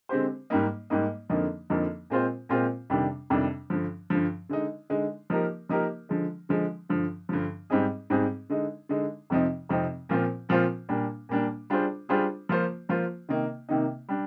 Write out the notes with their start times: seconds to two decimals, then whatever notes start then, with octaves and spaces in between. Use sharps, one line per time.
0.09 D3 G#3 C4 G4 C5
0.50 G#2 G3 A#3 D#4
0.90 G#2 G3 A#3 D#4
1.30 F2 D3 F3 A#3 D#4
1.70 F2 D3 F3 A#3 D#4
2.10 A#2 G#3 C4 F4 C5
2.49 A#2 G#3 C4 F4 C5
2.90 F2 C3 D#3 G3 D4
3.30 F2 C3 D#3 G3 D4
3.70 G2 D3 F3
4.10 G2 D3 F3
4.49 D3 G#3 D#4
4.90 D3 G#3 D#4
5.30 F3 A#3 D#4 G4 A#4
5.69 F3 A#3 D#4 G4 A#4
6.09 D3 F3 G#3
6.49 D3 F3 G#3
6.89 G2 D3 F3
7.29 G2 D3 F3
7.70 G#2 G3 C4 D#4 G#4
8.10 G#2 G3 C4 D#4 G#4
8.50 D3 G#3 D#4
8.89 D3 G#3 D#4
9.30 F2 C3 F3 C4 D#4
9.69 F2 C3 F3 C4 D#4
10.09 A#2 F3 C4 F4 C5
10.49 A#2 F3 C4 F4 C5
10.89 A#2 G3 A#3 D4
11.29 A#2 G3 A#3 D4
11.70 G3 D4 F4 G#4 C5
12.09 G3 D4 F4 G#4 C5
12.49 F3 A#3 F4 C5
12.89 F3 A#3 F4 C5
13.29 C3 D#3 A#3 D#4
13.69 C3 D#3 A#3 D#4
14.09 G3 D4